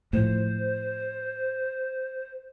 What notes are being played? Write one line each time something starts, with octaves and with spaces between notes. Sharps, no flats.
A2 F3 C5